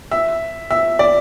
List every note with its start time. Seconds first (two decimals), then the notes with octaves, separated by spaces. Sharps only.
0.11 E5
0.71 E5
0.99 D5